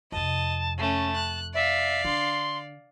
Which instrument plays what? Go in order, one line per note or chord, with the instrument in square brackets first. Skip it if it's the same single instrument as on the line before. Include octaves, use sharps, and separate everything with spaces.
[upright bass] F2 C3 [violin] D#5 [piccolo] A5
[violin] A3 C#4 [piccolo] A5
[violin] F#6
[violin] D5 F5 [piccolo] E5
[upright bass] D3 [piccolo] C6